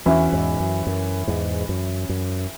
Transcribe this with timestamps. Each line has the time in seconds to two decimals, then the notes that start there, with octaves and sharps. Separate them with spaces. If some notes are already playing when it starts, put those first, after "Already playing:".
0.06 E2 E3 C#4 F#4 E5
0.32 E2 G#2
0.60 F#2
0.87 F#2
1.28 E2 G#2
1.69 F#2
2.09 F#2